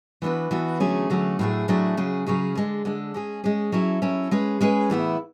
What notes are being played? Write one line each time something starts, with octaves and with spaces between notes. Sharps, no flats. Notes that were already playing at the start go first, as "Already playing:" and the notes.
E3 B3 D4 F#4 B4
E3 B3 D4 F#4 B4
D3 F#3 A3 C#4 G#4
D3 F#3 A3 C#4 G#4
A2 F#3 A3 D4 G#4
A2 F#3 A3 D4 G#4
C#3 F#3 C#4 G#4
C#3 F#3 C#4 G#4
D3 G#3 D4
D3 G#3 D4
G#3 C#4 G#4
G#3 C#4 G#4
F#3 C#4 E4 A4
F#3 C#4 E4 A4
G#3 C#4 G#4 B4
G#3 C#4 G#4 B4
A2 E3 B3 E4